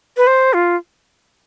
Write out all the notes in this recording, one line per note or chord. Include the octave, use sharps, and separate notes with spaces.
B4
C5
F4